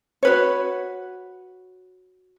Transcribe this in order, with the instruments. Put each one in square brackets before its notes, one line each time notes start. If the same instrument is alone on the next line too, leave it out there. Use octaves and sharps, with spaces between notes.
[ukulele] F#4 B4 C#5